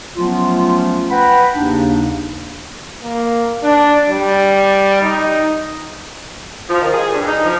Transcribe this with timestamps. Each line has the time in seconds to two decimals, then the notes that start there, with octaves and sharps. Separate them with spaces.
0.17 F3 F#3 A3 B3 C#4 F4
1.11 B4 F#5 G5 A#5 B5
1.53 D#2 C#3 D4 D#4
3.03 A#3
3.63 D4
4.09 G3
5.02 D#4
6.69 F3
6.80 D#3
6.92 G#4
7.11 G2
7.27 D#4
7.44 F3